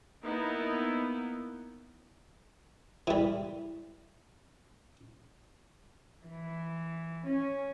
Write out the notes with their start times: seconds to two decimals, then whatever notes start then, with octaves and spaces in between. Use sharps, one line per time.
0.23 A#3 B3 D#4 E4 A#4
3.07 E3 G3
6.25 E3
7.26 C#4